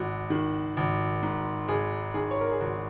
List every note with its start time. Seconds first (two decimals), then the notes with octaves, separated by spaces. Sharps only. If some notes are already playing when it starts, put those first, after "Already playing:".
Already playing: G#1 F#4
0.30 D#3
0.77 G#1
1.23 G#2
1.68 G#1 G#4
2.14 D#3 G#4
2.31 C#5
2.41 A#4
2.51 G#4
2.60 G#1 F#4